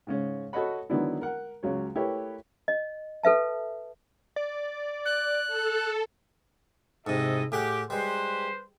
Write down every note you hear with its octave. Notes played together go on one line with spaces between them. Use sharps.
G#2 C#3 C#4
F#4 A4 C#5 D#5 F#5 B5
D3 D#3 F#3 B3 D4 E4
A#4 F#5
C#2 C#3 F#3 C#5
A3 E4 G4 A#4 B4 C#5
D#5
A4 B4 E5 A5
D5
F#6
A4
G#2 C3 E4 A4 D#5
A2 G4 G#4 F#5
G3 G#3 B4 C5